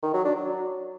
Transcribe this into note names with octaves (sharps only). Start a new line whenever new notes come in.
D#3
F#3
D4
F#3